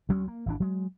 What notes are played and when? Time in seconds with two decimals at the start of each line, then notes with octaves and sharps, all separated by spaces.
0.09 D2 F#3 G#3 C#4
0.28 A#3
0.46 G#1 E3 D4
0.60 F#3 G#3